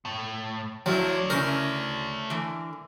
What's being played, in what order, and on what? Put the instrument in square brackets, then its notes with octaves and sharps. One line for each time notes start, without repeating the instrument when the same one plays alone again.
[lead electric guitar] A2
[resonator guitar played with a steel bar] F3 E4 [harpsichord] F#3 [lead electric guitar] A3 D5
[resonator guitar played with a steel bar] C#3 C#4 E4 [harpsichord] A#4
[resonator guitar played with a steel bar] D3 E3